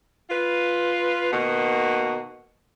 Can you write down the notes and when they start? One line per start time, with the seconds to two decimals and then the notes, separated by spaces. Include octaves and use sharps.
0.30 F4 B4
1.32 B2 D#3 A#3 F#4